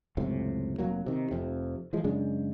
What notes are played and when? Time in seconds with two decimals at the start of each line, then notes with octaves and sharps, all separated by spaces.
0.17 C#2 F#2 A2 C3
0.78 F1 F#3 A#3
1.06 C3 D#3
1.31 F1 F2 C3
1.93 E3 F3 G#3
2.04 F#2 C#3 G#3 D4